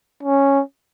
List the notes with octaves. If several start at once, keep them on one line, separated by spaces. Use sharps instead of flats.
C#4